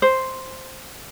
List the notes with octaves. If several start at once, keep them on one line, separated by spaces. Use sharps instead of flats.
C5